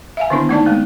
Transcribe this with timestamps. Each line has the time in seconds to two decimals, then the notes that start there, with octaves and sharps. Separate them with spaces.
0.17 E5 F5 G#5
0.30 D3 D#3 B3 D4 E4
0.49 A3 D#4 D5 A5
0.66 G#3 A#3 B3